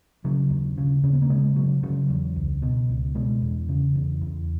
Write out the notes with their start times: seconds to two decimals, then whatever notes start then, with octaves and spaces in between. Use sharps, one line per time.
0.25 C#3 F#3
0.50 D#2
0.78 C#3
1.03 C#3 C#4
1.13 B3
1.22 A#3
1.29 C#3 G#3
1.56 C#3 F#3
1.83 C#3 F#3
2.10 E2
2.36 C#2
2.62 B2
2.89 C#2
3.15 B2 G#3
3.42 E2
3.69 C#3
3.95 E2
4.21 E2